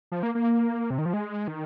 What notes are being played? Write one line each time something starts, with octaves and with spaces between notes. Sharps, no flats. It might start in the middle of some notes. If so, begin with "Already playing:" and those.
F3
A#3
A#3
C3
D#3
F3
G#3
D#3